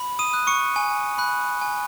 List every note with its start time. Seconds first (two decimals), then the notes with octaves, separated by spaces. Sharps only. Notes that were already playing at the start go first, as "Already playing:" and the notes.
Already playing: B5
0.19 D#6 D#7
0.33 D#6 F#6
0.47 C#6 C#7
0.76 G#5
1.18 B5 F#6
1.61 G#5